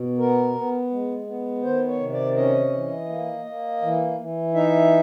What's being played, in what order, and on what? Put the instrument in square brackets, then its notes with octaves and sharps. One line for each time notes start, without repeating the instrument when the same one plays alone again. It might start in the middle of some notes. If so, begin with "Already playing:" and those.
Already playing: [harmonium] B2
B3 A#4
B3
G#3
B3
D#3 C5
C#5
C3
D5
C#4 D#5
E3
A#3
A#3
E3
E3
D#4 E5